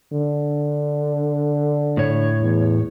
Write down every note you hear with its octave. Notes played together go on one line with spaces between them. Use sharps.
D3
A2 C#5
E2